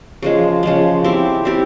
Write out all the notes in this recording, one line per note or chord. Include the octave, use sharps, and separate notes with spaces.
C#3 F3 G#3
C#3 F3 G#3
C4 E4 G4
C4 E4 G4